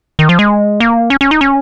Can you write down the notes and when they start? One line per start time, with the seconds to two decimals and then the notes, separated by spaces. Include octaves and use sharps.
0.19 D#3
0.29 F3
0.39 G#3
0.80 A#3
1.10 C#4
1.21 C#4
1.31 D#4
1.41 C#4